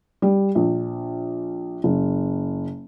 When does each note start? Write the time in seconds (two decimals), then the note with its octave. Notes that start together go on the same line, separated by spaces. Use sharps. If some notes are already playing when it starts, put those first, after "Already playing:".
0.22 G3
0.55 A#1
1.84 F#1